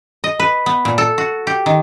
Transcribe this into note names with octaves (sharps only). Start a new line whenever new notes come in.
D#5
B4
B3
A#2
A4
F#4
G4
D#3